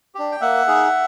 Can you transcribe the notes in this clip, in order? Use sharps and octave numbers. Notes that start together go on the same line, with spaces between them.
D4 G4
G5
A#3 E5 F#5
D#4 G#4